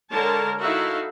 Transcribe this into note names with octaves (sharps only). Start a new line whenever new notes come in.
D3 G#3 A#4 C#5 A5
D#4 E4 F#4 A4 E5 F5